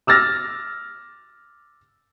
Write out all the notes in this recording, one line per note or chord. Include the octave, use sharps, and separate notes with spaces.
D6 E6 F6 A6 A#6